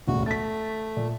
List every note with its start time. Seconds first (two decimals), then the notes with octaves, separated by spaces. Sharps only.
0.07 E1 A1 D2 F#4
0.26 A3 A6 B6
0.97 A#2